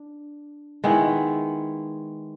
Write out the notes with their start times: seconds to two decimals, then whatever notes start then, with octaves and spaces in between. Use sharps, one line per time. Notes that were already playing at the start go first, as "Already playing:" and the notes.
Already playing: D4
0.84 D#3 G#3 B3 E4